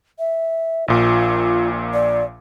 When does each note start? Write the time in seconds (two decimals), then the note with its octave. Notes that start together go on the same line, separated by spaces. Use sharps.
0.19 E5
0.88 A#1 A#2 F4 D6
1.94 D5